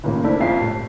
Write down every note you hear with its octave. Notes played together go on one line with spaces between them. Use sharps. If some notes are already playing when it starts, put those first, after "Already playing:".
C#2 A2 D#3 A#3
A3 D4 E4 A#4 C5
F#1 F2 F4 C7
A2 G3